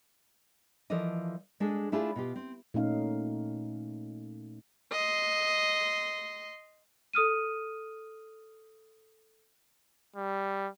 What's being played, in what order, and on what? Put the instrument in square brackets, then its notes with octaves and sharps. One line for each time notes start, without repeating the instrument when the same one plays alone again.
[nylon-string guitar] E3 F3 A4 A#4 D5 D#5
G#3 D4 G#4 A4
A3 D4 E4 F4 G4 G#4
B2 F4 G4
C4
[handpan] A#2 A3 C#4 D#4 F5
[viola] D#5 C6
[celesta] A4 D#6 F6 D#7
[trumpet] G3